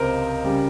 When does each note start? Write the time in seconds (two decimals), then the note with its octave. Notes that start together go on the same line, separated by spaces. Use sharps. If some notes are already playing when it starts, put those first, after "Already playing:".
Already playing: C#2 C3 A#4 C5 D#5
0.44 C#3 G3